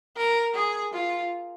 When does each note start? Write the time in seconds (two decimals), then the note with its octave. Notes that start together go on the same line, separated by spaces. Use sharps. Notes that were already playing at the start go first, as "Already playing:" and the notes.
0.17 A#4
0.55 G#4
0.94 F4